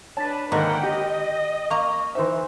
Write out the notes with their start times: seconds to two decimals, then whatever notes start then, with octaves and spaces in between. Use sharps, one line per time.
0.17 D4 B4 C#5 A5 A6 B6
0.52 G#2 D3 D#3 A#3 F#5 G5
0.83 G4 D#5
1.70 A#3 A#5 C#6
2.15 E3 D#4 C5 E5 C6